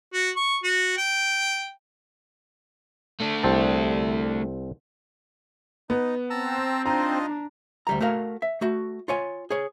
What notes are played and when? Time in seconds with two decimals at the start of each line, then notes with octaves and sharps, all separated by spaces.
0.13 F#4
0.36 C#6
0.64 F#4
0.97 G5
3.20 A3 D4
3.43 C2 C4 A5
5.90 B3 D#4
6.30 C4 A5 A#5 E6
6.86 D4 D#4 F4 D#5 A#5
7.87 D2 G3 A#5
8.01 A3 F#4 A#4 F5
8.42 E5
8.61 A3 F#4
9.08 F4 C#5 G#5
9.50 G#4 C#5